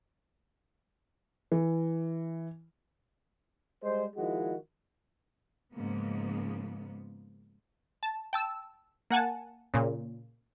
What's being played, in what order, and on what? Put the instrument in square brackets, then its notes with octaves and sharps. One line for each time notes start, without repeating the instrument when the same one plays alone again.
[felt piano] E3
[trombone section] G3 G#3 C5
D#3 F3 G#3 E4 F#4
[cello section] G#2 C#3 F3 A#3 B3
[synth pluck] A5
G5 A5 E6
A#3 F#5 G#5 A5
A#2 C#3